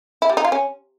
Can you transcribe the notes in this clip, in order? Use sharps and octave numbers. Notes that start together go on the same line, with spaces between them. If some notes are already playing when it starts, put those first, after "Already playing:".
E4
G3
D#4
F4
C#4